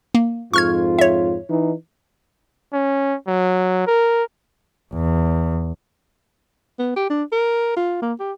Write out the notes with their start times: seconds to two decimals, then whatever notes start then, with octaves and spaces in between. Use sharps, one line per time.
0.15 A#3
0.54 F2 G#2 F4 C#6 F6 G#6
0.99 C#5 E5
1.50 E3 D#4
2.73 C#4
3.28 F#3
3.87 A#4
4.93 E2
6.79 B3
6.96 G4
7.10 D4
7.32 A#4
7.77 F4
8.02 A#3
8.20 G4